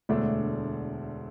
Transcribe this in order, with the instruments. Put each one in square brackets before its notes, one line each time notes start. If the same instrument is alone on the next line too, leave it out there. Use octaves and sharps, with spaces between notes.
[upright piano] E1 D2 D3 A3 D4